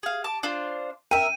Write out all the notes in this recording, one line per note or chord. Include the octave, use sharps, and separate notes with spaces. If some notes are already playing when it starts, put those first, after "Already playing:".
G#4 F5
A5 D6
D4 F4 C5
A#4 E5 G5 D#7